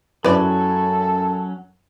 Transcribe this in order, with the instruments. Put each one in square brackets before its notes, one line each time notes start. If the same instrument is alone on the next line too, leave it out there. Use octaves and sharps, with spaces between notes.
[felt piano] F#2 E4 [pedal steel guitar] F#3 C#4 [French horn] A4 [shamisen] B4 D5